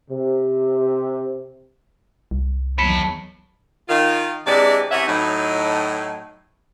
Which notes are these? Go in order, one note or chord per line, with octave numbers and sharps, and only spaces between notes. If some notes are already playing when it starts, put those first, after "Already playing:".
C3
C2
E2 D#3 F#3 C#5 A5 B5 B6 C#7
D#3 F4
C3 E3 G#3 D4 D5
C3 E3 C#4 C#5 E5 F#5
A2 F#3 D#4